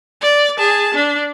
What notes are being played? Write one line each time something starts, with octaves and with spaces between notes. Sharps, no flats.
D5
G#4 A5
D4